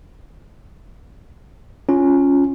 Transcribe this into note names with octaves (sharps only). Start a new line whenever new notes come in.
C#4 F4